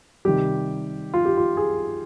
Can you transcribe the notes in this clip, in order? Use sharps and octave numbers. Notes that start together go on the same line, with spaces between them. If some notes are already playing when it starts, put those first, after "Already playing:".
C3 D#3 G3 G4
F4
G4
F4
G#4